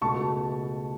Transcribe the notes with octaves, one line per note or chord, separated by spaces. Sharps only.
C#2 B2 A3 A5 C#6